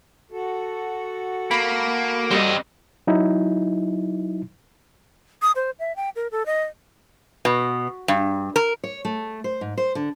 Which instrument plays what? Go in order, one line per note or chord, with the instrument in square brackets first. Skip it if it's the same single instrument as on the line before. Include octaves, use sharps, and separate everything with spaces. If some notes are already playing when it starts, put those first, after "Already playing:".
[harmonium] F#4 A4
[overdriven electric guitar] A#3 [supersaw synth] B5
[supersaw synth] G3 [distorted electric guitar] C4 D#5
[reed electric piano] F#3 D#4 E4
[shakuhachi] D#6
C5
E5
G5
A#4
A4
D#5
[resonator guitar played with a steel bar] B2
G2
A#4
[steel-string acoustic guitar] C#5
A3
C5
G#2
C5
D3